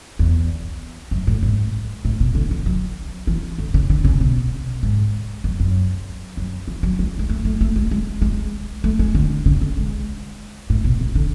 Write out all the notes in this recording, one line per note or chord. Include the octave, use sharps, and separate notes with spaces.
E2
F#2
A2
G#2
A2
B2
D3
E3
F#3
E3
D3
C#3
D3
C#3
B2
G#2
F#2
F#2
F#2
E3
F#3
G#3
G#3
A3
A3
A3
G#3
G#3
G#3
A3
G#3
D3
C#3
D3
G#3
A2
B2
C#3
D3